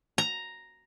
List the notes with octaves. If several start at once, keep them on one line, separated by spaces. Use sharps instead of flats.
A#5